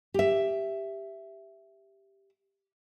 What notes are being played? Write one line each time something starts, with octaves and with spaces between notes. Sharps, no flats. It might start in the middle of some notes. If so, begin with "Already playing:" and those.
G4 E5